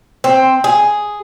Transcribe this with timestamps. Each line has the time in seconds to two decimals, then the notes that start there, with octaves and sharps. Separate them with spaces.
0.24 C4
0.64 G#4